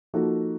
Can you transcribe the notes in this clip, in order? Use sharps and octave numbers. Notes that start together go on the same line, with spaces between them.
F3 A#3 D#4 F#4 A4